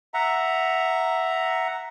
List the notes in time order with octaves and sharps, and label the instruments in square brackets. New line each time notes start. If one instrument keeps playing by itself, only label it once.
[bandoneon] E5 F#5 A#5